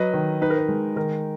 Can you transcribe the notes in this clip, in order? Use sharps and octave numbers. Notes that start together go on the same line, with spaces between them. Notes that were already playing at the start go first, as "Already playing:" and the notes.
Already playing: F#3 B4 D#5
D#3
D#4 B4
A#4
B4
G#3
D#3 A#4